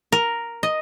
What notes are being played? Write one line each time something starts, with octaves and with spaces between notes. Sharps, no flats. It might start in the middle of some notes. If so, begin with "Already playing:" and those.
A#4
D#5